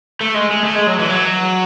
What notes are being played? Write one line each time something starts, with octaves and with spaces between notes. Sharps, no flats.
A3
G#3
G#3
A3
G#3
F#3
E3
F#3